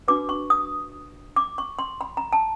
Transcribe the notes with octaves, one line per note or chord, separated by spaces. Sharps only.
D4 F#4 B4 D6
C#6
D#6
D6
C#6
C6
B5
A#5
A5